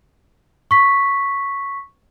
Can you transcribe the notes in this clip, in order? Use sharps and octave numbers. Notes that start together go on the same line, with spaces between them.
C#6 B6